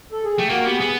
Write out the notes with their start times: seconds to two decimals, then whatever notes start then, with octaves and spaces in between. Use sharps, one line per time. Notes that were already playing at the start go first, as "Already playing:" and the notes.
0.12 A4
0.25 G#4
0.37 A3 G4
0.50 A#3 F#4
0.65 B3 G4
0.77 B3 G#4